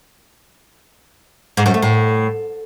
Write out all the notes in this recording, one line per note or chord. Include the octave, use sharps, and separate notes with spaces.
G#2
F#2
A3
A2